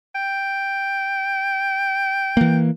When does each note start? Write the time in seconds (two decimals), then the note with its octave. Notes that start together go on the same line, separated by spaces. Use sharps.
0.15 G5
2.37 E3 A#3